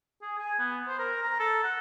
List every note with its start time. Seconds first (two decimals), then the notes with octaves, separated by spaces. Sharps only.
0.22 G#4
0.38 G#5
0.59 B3
0.87 C5
0.99 A#4
1.23 A#5
1.39 A4
1.64 F#5